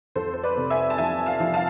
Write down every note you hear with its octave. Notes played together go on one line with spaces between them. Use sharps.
F2 A4 C5
C5
B4 D5
C3
E5 G#5
A5
F3 E5 G#5
F5 A5
F3
F5 A5